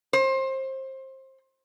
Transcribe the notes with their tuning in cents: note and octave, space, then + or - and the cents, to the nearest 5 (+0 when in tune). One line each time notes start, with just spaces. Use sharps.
C5 +25